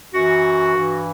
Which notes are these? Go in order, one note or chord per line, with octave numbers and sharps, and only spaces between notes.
F#2 E3 F#4
G2 E3